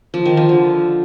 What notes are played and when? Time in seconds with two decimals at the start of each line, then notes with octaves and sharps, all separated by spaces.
0.14 F3
0.25 D#3
0.37 F3
0.49 D3